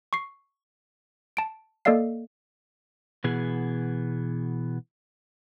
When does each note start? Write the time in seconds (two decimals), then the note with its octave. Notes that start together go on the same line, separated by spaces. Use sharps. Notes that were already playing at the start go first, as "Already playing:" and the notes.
0.13 C#6 C7
1.37 A5 D7
1.85 A#3 A4 D5 D#5 F5 C7
3.24 B2 E3 B3 G#4